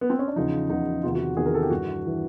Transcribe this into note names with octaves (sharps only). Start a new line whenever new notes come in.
B3
C4
C#4
D4
E2 C#3 F3 D#4
E2 C#3 F3 D#4
E2 C3 D#3 F4
F#4
E2 C3 D#3 G#4
A#4
A4
G4
G2 E3 F#4
E3